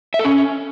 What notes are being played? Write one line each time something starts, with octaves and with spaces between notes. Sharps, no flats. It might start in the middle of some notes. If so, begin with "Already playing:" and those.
E5
A4
C#4